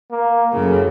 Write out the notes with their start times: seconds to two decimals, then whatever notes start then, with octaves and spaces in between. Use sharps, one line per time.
0.11 A#3
0.53 F#2 A2 C#3